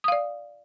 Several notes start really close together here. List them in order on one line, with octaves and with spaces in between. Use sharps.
D#6 F5 D5